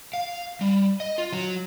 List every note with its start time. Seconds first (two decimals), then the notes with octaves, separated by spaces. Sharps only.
0.14 F5
0.61 G3
1.00 D#5
1.18 F4
1.33 F#3